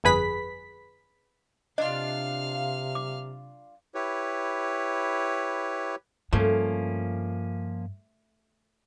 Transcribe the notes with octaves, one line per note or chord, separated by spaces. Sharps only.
G1 F2 G#4 B4 B5 B6
C3 D4 F4 D#5 F5 F6
D6
E4 G4 B4 C#5
G2 F3 A3 A#3 C#4